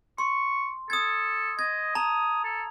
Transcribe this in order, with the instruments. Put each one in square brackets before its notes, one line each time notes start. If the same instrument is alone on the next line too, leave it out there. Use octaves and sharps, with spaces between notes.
[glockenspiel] C6 [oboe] C#6
[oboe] A4 [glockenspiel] D#6 G#6
[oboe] D#5 [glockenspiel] G#6
[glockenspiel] A5 A#5 F7 [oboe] D#6
[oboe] A4